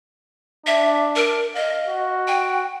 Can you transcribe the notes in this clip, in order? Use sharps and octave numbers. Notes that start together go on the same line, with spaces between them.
D4 E5
A#4
D#5 F5
F#4
G5